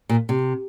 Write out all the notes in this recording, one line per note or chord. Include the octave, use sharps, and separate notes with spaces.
A#2
C3